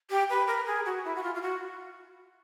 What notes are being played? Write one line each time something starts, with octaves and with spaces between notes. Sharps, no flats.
G4
B4
A#4
G#4
F#4
E4
F#4
F4
F4
F#4